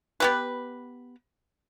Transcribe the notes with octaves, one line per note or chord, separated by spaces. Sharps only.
B3 G4 B4